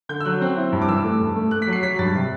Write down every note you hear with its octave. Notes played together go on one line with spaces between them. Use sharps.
D3 G6
E6
F#3 F#6
C4
E4
G2
D6
E3 E6
A3
G2
A3
A3 F#6
B6
F#3
C7
F#3 B6
G2 A6
C3